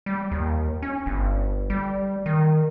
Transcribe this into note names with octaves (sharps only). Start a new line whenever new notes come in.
G3
D#2
C#4
G1
G3
D#3